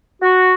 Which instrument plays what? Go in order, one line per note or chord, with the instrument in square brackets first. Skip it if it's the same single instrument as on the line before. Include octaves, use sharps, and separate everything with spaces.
[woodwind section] F#4